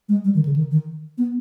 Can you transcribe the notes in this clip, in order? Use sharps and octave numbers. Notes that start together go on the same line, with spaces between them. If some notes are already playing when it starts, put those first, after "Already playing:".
G#3
G3
D#3
C#3
D#3
D#3
B3